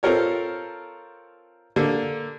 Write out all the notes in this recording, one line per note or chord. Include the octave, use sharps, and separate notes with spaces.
C4 F4 A4 A#4 C#5
D3 A#3